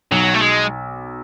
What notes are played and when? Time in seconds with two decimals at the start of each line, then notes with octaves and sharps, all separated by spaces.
0.11 B1 F#3
0.34 A3
0.41 G#3